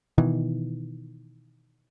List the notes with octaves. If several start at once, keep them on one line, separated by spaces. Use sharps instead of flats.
B2 D#3 E3